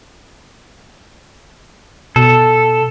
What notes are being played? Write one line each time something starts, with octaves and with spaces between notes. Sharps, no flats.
B2 A4